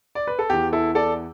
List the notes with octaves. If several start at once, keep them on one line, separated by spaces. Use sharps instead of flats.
D5
B4
A4
E2 E3 G4
E4 A4
A4 D5